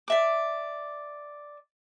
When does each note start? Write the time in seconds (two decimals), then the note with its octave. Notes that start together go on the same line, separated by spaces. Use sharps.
0.08 D5 E5 D6